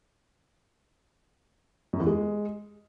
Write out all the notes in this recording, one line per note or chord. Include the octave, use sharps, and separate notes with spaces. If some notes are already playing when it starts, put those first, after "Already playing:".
F#2
E2
G#3